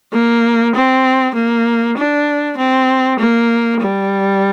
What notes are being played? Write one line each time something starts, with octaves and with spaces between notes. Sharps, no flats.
A#3
C4
A#3
D4
C4
A#3
G3